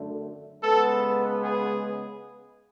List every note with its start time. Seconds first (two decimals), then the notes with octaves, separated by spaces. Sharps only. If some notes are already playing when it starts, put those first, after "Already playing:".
Already playing: F#2 D3 A3
0.62 C#3 G#3 B3 A4
1.42 G#4